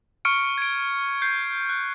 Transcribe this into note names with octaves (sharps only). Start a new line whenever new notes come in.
C#6 F6 C#7 D7
G#6 D7
G6 C7
F#6